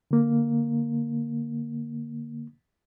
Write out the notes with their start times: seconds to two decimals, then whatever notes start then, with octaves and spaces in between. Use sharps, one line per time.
0.11 D3 A#3